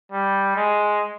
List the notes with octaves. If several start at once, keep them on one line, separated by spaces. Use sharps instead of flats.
G3
G#3